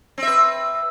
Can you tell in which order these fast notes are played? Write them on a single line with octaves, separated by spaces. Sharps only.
C4 E5 B4